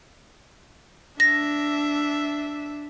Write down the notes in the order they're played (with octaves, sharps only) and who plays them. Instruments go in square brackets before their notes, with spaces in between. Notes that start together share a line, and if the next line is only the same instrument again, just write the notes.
[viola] D4 E5 [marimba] A#6